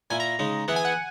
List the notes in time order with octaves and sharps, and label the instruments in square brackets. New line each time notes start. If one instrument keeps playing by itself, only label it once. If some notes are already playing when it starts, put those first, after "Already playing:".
[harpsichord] A#2 A#3 E4 [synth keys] G#5
[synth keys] A#5
[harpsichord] C#3 G#3 D#4
[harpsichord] E3 B3 E4 G#4 [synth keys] F#5
[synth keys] G#5
F#5